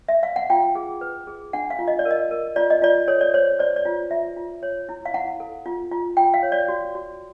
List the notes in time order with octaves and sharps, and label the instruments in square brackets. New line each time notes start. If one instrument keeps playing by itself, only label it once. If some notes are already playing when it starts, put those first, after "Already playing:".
[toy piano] E5
F5
F#5
F4 G5
G#4
B4
G#4
D4 F#5
F5
F4
D#5
D5
A#4
D#5
A#4
F4 D5
D#5
F4 D5
A4 C#5
D5
C5 C#5
C5 D5
D5
F4
F4 E5
F4
C#5
E4
F5
E4 F#5
A4
F4
F4
F4 G5
F5
C#5
D5
F#4
F#4